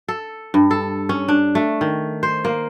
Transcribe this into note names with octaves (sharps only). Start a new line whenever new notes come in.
A4
G2
A4
C#4
D4
A3
D#3
C5
A#3